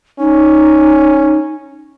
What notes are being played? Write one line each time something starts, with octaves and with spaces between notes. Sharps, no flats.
C#4 D#4